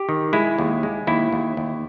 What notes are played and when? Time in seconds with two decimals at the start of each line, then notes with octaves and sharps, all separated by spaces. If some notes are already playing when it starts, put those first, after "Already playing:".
Already playing: G4
0.09 D#3
0.33 G#3 E4
0.59 D#2
0.83 G#3
1.07 D#2 E4
1.32 D#2
1.57 D#2